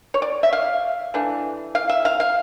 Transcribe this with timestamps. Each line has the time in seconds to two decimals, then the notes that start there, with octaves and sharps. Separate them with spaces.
0.14 C#5
0.22 D5
0.43 E5
0.53 F5
1.14 E3 A3 D4
1.75 F5
1.89 E5
2.05 F5
2.20 F5